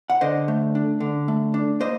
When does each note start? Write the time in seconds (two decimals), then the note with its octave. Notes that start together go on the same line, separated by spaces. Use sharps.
0.10 F#5
0.21 D3 C5 D#5
0.48 A3
0.75 D4
1.00 D3
1.28 A3
1.54 D4
1.80 A#3 C5 D#5